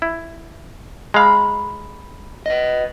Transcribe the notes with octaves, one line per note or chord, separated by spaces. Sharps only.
E4
G#3 F5 A#5 B5
B4 D#5